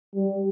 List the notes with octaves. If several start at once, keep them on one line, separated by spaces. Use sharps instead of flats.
G3